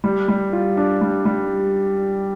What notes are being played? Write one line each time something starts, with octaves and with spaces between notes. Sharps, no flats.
G3
G3
F4
D4
G3
G3